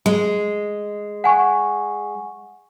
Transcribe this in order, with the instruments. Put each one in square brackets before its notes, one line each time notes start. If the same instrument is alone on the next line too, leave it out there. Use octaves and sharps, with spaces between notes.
[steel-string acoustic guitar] G#3
[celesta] F#5 G#5 C#6